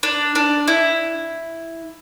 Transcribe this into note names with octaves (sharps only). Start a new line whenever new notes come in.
D4
D4
E4